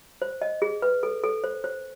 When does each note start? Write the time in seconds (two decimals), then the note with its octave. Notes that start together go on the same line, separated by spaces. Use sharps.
0.22 C5
0.42 D#5
0.62 G#4
0.82 B4
1.03 A4
1.24 A4
1.44 C5
1.64 C5